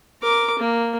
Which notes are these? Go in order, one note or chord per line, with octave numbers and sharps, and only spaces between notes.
A#4 D6
A#3